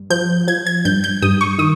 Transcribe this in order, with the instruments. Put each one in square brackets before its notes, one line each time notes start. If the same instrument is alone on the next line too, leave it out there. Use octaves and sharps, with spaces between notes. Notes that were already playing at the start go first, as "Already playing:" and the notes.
Already playing: [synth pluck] G2
F3 G6
F3 G#6
G#6
G2 G6
G6
G2 D#6
C#6
D#3 D#6